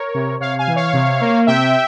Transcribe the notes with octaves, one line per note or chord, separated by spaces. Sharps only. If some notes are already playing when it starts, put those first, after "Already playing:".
Already playing: A#4 C#5
C3
C3 C#5 F5
F5 G#5
E3
C#5 F5
C3
A#3
C3 E5 G5